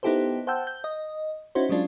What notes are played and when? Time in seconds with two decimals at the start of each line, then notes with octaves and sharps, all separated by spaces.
0.03 B3 D#4 E4 G4 A4 C5
0.47 C5 F#5 G5 A5 E6 G6
0.67 G6
0.84 D#5
1.55 C#4 D#4 E4 F#4 C5
1.69 F#3 G#3 C#4 D4 F4